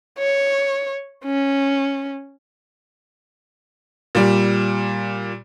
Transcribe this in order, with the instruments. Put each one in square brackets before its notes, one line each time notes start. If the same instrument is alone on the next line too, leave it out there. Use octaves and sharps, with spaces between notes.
[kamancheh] C#5
C#4
[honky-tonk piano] A#2 G3